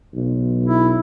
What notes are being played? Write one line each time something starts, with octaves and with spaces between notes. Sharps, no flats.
B1
E4